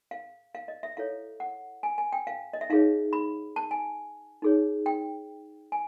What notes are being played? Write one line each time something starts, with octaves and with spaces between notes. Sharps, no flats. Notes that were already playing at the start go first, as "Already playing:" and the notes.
F5
F5
D#5
E5
E4 A4 C#5 F5
F#5
G#5
G#5
G5
F5
D#5
E5
D#4 G#4 C#5 F5
B5
A5
G#5
D#4 G#4 C#5
G5
G#5